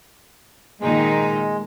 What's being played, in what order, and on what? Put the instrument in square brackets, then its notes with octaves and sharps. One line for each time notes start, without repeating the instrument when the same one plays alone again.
[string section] A#2 D#3 D#4 [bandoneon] G#3